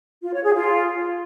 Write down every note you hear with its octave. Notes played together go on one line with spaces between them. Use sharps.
F4
C#5
G#4
F4